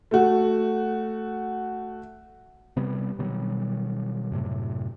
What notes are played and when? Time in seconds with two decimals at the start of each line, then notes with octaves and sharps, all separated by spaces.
0.11 A3 F#4
2.77 C3 G3 B3
3.19 B2 D#3 F#3 G3
4.32 F#2 A2 C3